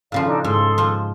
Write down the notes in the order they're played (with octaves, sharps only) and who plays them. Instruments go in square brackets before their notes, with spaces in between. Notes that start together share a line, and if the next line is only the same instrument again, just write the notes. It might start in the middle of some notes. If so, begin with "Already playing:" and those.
[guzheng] A2 C#3 F3 [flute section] D5 F5
[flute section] D4 D#4 A4
[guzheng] G#2 [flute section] G#4 A4 C6
[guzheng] F3